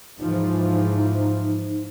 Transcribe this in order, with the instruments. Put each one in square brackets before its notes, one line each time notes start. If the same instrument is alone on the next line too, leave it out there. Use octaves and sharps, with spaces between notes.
[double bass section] G#2 E3 F3 [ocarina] D#4